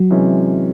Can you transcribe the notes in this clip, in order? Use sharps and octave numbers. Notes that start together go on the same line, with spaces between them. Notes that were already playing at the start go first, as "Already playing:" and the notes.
Already playing: F#3
C3 E3 G#3 C#4